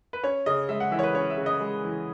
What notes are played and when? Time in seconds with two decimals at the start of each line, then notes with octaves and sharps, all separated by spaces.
0.13 B4
0.23 C#4 C#5
0.46 C#3 D#5
0.69 G#3 E5
0.80 F#5
0.91 E3 E5
0.99 C#5
1.03 B4
1.14 C#4 C#5
1.30 E5
1.37 C#3
1.46 D#5
1.61 G#3
1.84 E3